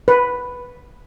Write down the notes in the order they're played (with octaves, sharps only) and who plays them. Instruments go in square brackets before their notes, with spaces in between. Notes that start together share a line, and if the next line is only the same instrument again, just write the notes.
[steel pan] B4